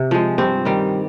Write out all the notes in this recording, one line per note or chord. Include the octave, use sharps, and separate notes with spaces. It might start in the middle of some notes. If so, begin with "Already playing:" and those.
Already playing: C3
F3 G#3
G2 C4
D#3 G3